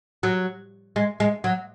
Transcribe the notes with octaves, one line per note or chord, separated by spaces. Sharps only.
F#3
G#3
G#3
F#3